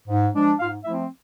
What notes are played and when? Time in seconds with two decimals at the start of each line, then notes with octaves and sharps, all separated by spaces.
0.08 G#2
0.34 F3 G#3 D4
0.59 G#2 F4 F5
0.85 F3 A3 C4 E4 E5